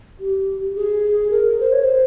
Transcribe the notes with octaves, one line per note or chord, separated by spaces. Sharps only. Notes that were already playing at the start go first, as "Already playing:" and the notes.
G4
G#4
A#4
C5
C#5
C5